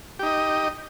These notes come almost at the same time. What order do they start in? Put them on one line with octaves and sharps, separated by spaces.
G4 D#4 D#5